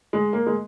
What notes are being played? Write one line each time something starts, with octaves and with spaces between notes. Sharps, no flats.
G#3
A#3
G#3